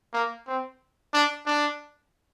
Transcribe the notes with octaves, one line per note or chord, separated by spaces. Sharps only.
A#3
C4
D4
D4